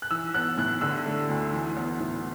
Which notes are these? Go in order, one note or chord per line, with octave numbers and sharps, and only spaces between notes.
F#6
E3 E6
B3 F#6
A2 F#6
D3 E6
A3
D2
E3
B3
A2